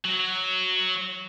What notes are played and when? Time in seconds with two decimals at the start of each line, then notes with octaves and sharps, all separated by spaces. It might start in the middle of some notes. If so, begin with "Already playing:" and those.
0.05 F#3